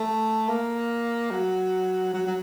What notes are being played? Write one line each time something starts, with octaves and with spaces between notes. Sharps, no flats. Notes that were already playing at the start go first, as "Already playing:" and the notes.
Already playing: A3
A#3
F#3
F#3
F#3